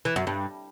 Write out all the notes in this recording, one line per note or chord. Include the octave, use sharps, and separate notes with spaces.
E3
F#2
G2